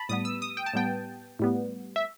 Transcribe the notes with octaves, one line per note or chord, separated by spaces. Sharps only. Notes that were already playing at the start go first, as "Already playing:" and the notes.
Already playing: A5 B5
A2 G3 B3 D#6
E6
D#6
G5
A5
A2 G3 B3 G5
A2 G3 B3
E5